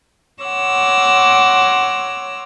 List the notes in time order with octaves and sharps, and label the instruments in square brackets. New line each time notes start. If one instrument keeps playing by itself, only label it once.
[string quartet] C#5 F#5 C6 D6 E6 A#6